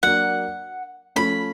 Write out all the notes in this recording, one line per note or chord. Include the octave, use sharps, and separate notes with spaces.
F#3 A#3 D4 F#5
F3 A3 C#4 B5